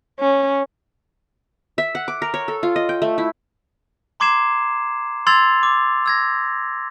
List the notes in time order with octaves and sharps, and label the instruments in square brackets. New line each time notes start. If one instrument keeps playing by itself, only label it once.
[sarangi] C#4
[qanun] E5
F#5
D6
A#4
C#5
A4
F4
D#5
G5
A3
E4
[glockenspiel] A#5 C6 D6 G#6 C7 E7
C6 E6 G#6 A6 C7 F7
D6
E6 G#6 A#6